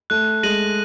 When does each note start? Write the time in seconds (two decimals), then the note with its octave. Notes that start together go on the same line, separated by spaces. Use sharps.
0.10 A3 F#6
0.43 G#3 A#6 D#7 F#7